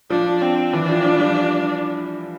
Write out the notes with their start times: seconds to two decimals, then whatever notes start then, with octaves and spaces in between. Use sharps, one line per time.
0.10 F3 D4
0.42 C4
0.73 E3 D4
0.90 F3
1.05 F3
1.16 G3
1.21 F3